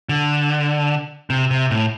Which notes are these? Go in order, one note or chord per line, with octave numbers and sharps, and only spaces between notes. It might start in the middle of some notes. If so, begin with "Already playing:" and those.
D3
C3
C3
A2